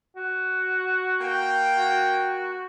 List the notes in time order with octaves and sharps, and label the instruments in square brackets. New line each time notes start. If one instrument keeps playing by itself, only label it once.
[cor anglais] F#4
[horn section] A#3 G5
[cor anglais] F#4